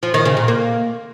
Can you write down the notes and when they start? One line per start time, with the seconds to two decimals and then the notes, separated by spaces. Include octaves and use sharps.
0.03 F3
0.14 D#3
0.25 C#3
0.37 A#2
0.48 A#3